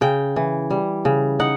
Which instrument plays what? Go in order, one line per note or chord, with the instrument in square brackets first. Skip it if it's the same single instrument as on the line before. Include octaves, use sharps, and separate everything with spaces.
[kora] C#3 G5
E3
G3
C#3
D#4 F#5